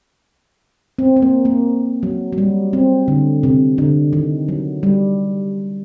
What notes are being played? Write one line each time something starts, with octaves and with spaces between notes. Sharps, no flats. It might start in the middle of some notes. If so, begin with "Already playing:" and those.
C4
C4
A#3
A#3
F#3
F#3
G3
C4
D3
C3
D3
D#3
F#3
G3